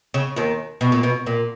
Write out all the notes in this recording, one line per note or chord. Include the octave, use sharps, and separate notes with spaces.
C#3
D#2 D#3
B2
A#2
B2
A#2